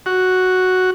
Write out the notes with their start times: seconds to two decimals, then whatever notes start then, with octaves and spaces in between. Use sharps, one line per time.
0.06 F#4